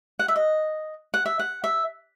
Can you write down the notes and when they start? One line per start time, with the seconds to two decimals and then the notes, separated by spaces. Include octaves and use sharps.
0.19 F#5
0.28 E5
0.36 D#5
1.14 F#5
1.26 E5
1.39 F#5
1.64 E5